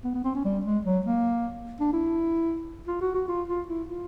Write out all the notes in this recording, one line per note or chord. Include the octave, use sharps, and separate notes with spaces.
B3
B3
C4
C#4
G3
G#3
F#3
A#3
D4
E4
F4
F#4
F#4
F4
F4
E4
F4